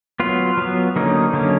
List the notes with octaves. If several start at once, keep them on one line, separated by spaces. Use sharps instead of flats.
F#3 B3 F4
F#3 B3
D3 F#3 A#3 C#4 D#4
D3 F#3 A#3 C#4